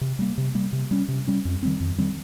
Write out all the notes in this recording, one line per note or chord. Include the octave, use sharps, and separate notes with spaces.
C3
G3 A#3
C3
G3 A#3
C3
G3 C#4
C3
G3 C#4
F2
D#3 G3 C4
F2
D#3 G3 C4